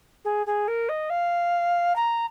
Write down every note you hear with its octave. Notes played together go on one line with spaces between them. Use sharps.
G#4
G#4
A#4
D#5
F5
A#5